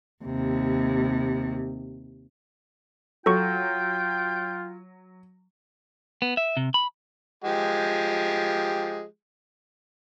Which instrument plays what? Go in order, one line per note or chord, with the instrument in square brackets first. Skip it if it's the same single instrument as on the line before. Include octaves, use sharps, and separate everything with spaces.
[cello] D#2 C3
[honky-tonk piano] F#3 [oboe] F4 [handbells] A4 C#6 [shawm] G5
[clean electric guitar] B3
E5
C3
B5
[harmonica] F3 G#3 G4